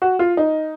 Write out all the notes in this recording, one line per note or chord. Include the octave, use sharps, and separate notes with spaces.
F#4
F4
D#4